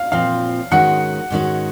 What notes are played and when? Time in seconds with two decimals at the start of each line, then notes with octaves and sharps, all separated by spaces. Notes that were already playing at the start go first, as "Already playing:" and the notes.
Already playing: F5
0.12 A#2 F3 C4 F5
0.71 G#2 D#3 G#3 C#4 F#4 F#5
1.30 G#2 D#3 G#3 C#4 F#4